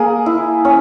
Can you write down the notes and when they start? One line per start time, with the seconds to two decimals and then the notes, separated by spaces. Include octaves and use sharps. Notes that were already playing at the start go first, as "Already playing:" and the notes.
Already playing: A#3 G#4
0.26 E4
0.65 C#4